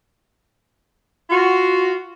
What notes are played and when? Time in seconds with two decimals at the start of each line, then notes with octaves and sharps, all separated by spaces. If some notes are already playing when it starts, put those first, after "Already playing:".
1.30 F4 F#4